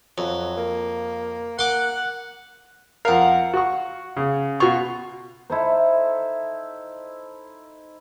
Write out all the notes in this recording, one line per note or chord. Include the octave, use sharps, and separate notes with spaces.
F2 F#3
A#3
A#3 F#5 C6 D6
F2 A#4 F5 F#5
F#4 C#6
C#3
B2 F4 G#5 C#6
D#4 E4 A4 C5